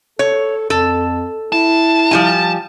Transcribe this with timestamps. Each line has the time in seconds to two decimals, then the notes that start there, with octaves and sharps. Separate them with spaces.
0.19 A4 C#5
0.70 F2 A4
1.53 E4 A5
2.11 F3 G3 G#5